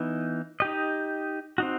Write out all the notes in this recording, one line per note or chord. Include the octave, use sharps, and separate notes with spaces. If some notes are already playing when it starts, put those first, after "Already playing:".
Already playing: E3 B3 D#4
D#4 G4 D#5
C4 D#4 F#4